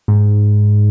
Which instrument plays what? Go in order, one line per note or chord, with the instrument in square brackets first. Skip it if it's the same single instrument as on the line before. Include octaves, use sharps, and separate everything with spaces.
[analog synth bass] G#2